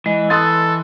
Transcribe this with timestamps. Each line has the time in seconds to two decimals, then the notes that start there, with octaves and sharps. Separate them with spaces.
0.06 E3 G#3 D#5
0.30 A4 C6 D#6 F#6 A6